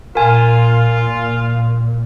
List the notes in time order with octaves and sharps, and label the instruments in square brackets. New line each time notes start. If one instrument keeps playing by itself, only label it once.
[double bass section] A#2 [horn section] F4 [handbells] A#4 G#5